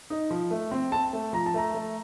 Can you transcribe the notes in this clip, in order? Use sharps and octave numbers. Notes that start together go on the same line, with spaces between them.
D#4
F3
A3
C4
C4 A5
A3
F3 A#5
A5
A3 A#5
A3